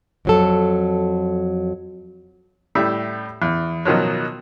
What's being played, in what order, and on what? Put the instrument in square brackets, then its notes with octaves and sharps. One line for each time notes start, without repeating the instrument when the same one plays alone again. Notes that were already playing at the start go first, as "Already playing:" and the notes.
[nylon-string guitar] F2 F#3 A4
[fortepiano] A2 G3 E5
E2
B2 D#3 F3 F#3